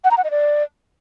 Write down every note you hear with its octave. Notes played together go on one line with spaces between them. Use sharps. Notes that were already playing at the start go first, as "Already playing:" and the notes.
F#5
A#5
F#5
D#5
D5